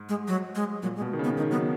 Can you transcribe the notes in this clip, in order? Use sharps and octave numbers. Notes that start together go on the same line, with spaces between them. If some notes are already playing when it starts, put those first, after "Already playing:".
Already playing: G#2
G#3
F#3
G#3
A#2 F#3
G#3
B2
D#3
C#3
B3
D#3 D#4
F#3 B3